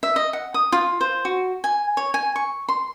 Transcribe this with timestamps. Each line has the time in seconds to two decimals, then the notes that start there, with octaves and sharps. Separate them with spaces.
0.03 E5
0.16 D#5
0.33 F#5
0.54 D#6
0.72 F4
1.01 C5
1.25 F#4
1.64 G#5
1.97 C#5
2.14 G#5
2.36 C#6
2.69 C6